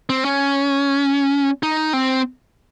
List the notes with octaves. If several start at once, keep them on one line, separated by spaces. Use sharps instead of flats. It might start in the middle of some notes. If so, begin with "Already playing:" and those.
C4
C#4
D#4
C4